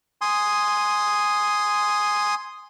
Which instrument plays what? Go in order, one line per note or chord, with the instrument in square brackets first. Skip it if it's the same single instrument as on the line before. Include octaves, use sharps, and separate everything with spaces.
[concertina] G#5 C6 D#6